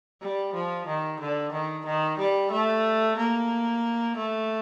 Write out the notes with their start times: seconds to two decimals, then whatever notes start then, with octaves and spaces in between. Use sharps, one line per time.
0.21 G3
0.54 F3
0.87 D#3
1.20 D3
1.53 D#3
1.85 D#3
2.18 G3
2.51 A3
3.17 A#3
4.16 A3